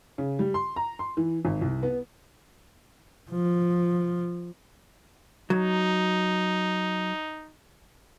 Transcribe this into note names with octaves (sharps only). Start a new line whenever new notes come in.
C#3
G3
C6
A#5
C6
E3
G#1
C2
B3
F3
F#3 D#4